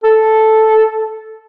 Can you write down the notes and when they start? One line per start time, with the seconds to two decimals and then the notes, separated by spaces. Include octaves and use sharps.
0.04 A4